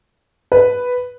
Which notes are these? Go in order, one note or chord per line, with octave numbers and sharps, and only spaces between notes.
B4